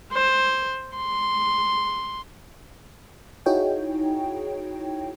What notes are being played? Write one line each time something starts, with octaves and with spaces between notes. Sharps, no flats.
C5
C6
D#4 E4 F#4 G#4 C#5 G5